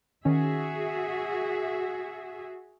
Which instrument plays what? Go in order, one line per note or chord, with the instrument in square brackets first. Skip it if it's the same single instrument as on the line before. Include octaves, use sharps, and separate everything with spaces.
[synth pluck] D#3 C#4 [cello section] F#4 G#4 E5